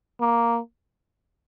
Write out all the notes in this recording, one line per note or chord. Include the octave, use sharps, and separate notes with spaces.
A#3